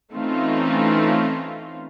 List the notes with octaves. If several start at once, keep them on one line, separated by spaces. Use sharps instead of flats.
E3 A3 C4 C#4 D#4 F4